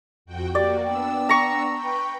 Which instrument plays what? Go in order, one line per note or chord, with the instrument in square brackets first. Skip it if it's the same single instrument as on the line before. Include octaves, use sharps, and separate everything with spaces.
[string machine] F2 F#4 G5
[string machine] A#3 F#4 [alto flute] G4 [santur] D5
[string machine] B3 D4 E6 [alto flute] G5
[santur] A#5 C#6
[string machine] B4 G5